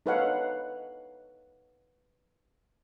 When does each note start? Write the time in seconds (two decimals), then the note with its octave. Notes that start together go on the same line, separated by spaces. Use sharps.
0.06 D#4 A4 B4 C#5 F5 F#5